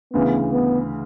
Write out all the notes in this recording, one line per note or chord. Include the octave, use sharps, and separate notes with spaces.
D2 C#3 E3 B3
B3